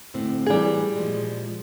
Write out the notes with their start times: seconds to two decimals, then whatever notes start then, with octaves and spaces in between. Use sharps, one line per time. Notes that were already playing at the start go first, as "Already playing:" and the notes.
0.14 D2 A2 C4
0.46 A2 D3 E3 G3 G#4
0.96 A#2 F3 G#3